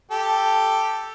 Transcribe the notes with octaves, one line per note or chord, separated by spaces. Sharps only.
G4 A4